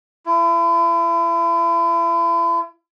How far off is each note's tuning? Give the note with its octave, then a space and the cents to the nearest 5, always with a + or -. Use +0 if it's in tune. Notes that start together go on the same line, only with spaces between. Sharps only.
E4 +40